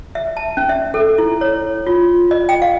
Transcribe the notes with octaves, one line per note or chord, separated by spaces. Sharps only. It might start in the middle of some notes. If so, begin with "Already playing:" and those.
E5
A5
C#4
E5
A4
E4
C#5
F4
D#5
G5
F5